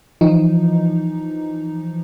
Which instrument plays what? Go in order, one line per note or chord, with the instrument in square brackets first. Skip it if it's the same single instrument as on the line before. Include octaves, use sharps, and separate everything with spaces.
[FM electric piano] E3 F3 D#4